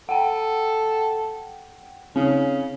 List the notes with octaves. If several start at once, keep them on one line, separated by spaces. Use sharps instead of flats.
A4 F#5 G5
C#3 C4